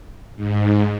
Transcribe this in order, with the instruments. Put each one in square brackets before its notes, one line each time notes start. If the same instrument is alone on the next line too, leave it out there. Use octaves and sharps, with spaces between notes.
[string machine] G#2